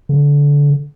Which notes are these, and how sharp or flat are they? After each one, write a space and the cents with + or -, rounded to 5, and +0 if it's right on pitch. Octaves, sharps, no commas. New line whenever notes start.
D3 -25